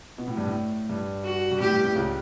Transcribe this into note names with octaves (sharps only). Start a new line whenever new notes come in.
B2
A2
G2
A2
G2
F#4
G2
A2 G4
G2
A2
C#2 C#3